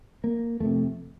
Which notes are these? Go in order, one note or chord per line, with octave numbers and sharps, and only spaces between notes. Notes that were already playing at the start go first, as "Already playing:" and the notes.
A#3
F2 C3 A3